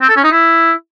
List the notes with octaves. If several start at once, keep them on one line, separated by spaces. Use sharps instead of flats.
C4
A4
C#4
D#4
E4